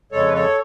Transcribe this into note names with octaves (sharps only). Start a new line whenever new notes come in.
F2 C#3 G#3 A4 C#5
B4
A4 C#5